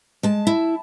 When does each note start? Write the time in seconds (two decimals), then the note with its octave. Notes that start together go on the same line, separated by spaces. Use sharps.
0.23 G#3 A5
0.47 E4